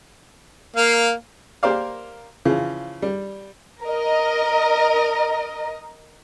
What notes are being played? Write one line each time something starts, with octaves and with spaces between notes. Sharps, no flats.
A#3 F5
A#3 G4 A#4 C5 D5 F5
C#3 E3 F3
G3
A#4 D#5